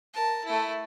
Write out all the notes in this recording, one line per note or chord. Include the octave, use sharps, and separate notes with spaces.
A#4 A5
A3 E4